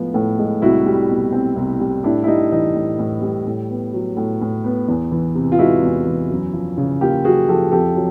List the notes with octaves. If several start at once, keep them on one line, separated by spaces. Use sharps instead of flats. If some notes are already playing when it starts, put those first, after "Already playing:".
Already playing: A2 F3 G#3 B3
A2
G#3
C2 E4 F#4
G3
B2
C4
C2
G3
A2 D4 E4
E4
G3 D#4
E3 D#4
A2
A2
G3
A2
B3
F#3
A2
A2
B3
E2
E3
C3
F4
G#3 E4 F#4
E2
E3
F#2
F3
C#3
A#3 F4 G4
F#2 F#4 G#4
F3 G4 A4
F2 G4 A4
F#3